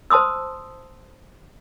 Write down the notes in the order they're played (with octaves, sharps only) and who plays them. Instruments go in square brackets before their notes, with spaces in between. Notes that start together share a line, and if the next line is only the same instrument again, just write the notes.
[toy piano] C5 A5 C6 D#6 E6